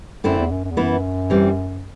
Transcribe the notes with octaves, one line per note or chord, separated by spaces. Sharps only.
F#2 D3 A3 C4 E4
E2
F#2
F#2
E2
F#2 E3 B3 E4
E3 G3 C4